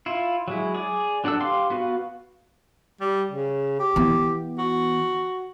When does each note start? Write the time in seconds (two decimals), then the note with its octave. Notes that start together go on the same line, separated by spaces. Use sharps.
0.06 E4 F4
0.48 F#3 G#3 E4
0.74 G#4 D5
1.24 F#3 D4 A4 F#5 E6
1.40 G4 B4 F5 C6 D6
1.70 B3 F#4 B4 F5
3.00 G3
3.31 C#3
3.79 G4
3.96 E3 B3
4.58 F#4